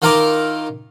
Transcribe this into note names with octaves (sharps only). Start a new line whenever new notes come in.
D#3 E4 F4 A#4 A#5 D6